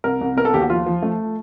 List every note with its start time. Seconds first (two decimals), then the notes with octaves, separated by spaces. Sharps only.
0.04 C2 A#4
0.21 C2
0.37 B3 A#4
0.45 A4
0.53 D#2 G4
0.61 F#4
0.70 F3 F4
0.86 F3
1.02 A3